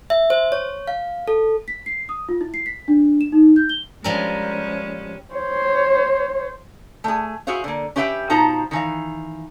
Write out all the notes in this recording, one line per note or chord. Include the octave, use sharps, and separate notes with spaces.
E5
C5
C#5
F5
A4
B6
C7
D#6
F4
E4
C7
B6
D4
E7
D#4
G6
G7
F3 G3 G#3 C#4 A#4
C5 C#5
A3 G#4
E4 F#4 G#4 C5 F5
D3 A#3
C#4 G4 B4 E5 F#5 G5
B2 D#4 F4 C5 A5 A#5
D#3 E3 F5